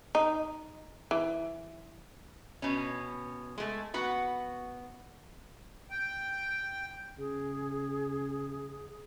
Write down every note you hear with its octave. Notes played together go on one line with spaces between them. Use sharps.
D#4
E3
B2 C#4
G#3 A3
B3 F#4 F#5
G5
C#3 G#4